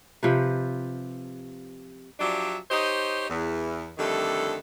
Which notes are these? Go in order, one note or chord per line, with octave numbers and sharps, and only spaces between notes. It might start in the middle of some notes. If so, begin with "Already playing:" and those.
C3 F3 B4
F3 F#3 D4 G4 D5 E5
D#4 G4 C5 C#5 D#5
E2
F2 D3 D#3 G3 A3 A4